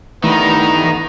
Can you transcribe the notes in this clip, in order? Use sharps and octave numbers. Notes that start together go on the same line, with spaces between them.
G2 D#3 E3 A3 B3 A#5